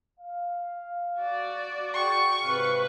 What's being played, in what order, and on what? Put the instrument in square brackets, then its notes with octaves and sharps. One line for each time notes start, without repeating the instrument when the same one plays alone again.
[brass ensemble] F5
[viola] F#4 D5
[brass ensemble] G#4 F#5 G5 [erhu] C#6
[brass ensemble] G#2 C3 [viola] B4 F5